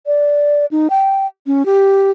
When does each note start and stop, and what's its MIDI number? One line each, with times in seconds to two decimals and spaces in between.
0.06 0.66 74
0.71 0.88 63
0.90 1.26 79
1.47 1.65 61
1.65 2.11 67